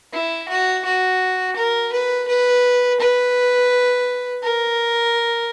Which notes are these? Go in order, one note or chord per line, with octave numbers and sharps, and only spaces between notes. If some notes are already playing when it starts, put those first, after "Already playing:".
E4
F#4
F#4
A#4
B4
B4
B4
A#4